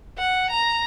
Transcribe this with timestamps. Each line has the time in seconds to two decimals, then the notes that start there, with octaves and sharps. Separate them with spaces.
0.18 F#5
0.51 A#5